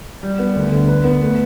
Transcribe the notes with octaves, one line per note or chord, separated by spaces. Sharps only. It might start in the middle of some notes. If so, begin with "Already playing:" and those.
G3
B3
D2
D3
B4
B3
A3